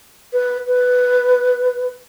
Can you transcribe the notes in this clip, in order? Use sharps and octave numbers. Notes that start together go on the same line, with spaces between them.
B4
B4